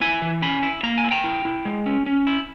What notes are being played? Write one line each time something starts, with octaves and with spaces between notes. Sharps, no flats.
E4 E5 G#5
E3
C#4 G#5 B5
E4
A#3 A#5
G#5
E4
G5 A#5
E4
E4
G#3
C#4
C#4
E4